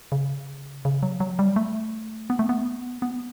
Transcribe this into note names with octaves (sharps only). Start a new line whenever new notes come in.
C#3
C#3
F#3
F#3
G3
A3
B3
A3
B3
B3